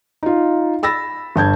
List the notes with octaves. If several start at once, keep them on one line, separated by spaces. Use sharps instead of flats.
D#4 F4
B5 E6 A6 A#6
G1 A5 G6 G#6